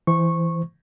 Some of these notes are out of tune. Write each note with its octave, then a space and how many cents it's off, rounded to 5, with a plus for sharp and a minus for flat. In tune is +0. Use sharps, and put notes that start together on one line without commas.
E3 +10 C5 -20 C#6 -15